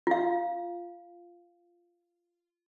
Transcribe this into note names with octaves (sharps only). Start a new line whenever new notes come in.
F4 F5